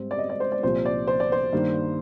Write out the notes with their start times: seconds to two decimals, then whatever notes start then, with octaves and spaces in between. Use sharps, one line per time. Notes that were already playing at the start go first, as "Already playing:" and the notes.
Already playing: G#2 G3 C4
0.11 D5
0.18 D#5
0.29 D5
0.40 C5
0.52 D5
0.63 C2 A#2 F3 C5
0.85 D5
1.07 C5
1.20 D5
1.32 C5
1.53 G2 D#3 A#3